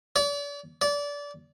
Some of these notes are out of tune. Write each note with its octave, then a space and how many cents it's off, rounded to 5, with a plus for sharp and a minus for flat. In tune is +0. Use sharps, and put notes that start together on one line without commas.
D5 -40
D5 -25